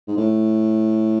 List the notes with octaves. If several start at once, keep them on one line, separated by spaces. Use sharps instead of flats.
G#2
A2